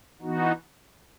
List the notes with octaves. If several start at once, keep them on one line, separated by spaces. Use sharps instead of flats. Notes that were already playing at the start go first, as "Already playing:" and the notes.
E3 B3 D#4 F#4